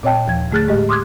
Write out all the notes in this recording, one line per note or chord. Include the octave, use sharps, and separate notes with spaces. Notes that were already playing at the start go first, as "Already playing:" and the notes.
A#2 C4 C#5 D#5 G5 A5
D#2 F3 G#6
D3 A3 G#4 F6 F#6 A6
A2 G#3 G4 D#5
C6 D6 D#6 F6 F#6 G#6